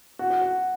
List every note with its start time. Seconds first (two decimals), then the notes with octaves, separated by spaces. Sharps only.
0.19 F#4
0.30 F#4
0.41 F#4